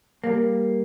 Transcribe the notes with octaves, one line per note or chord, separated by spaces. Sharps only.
G3 A#3